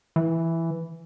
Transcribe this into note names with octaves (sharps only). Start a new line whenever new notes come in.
E3